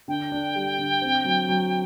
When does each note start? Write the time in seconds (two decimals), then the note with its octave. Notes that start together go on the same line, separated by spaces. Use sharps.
0.08 D3 G5
0.32 D4
0.55 G3
0.79 D3
1.02 C4
1.25 F#3
1.49 F#3